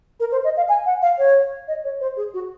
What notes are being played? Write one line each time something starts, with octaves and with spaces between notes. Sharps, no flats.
A#4
C5
D#5
F5
G#5
F#5
F5
C#5
D#5
C#5
C5
G#4
F#4